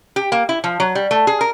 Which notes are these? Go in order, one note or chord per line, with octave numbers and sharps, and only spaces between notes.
G4
A#3
E4
F3
F#3
G3
A3
G#4
A#4